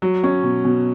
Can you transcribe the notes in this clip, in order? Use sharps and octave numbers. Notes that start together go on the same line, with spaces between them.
F#3
C#4
B2
B2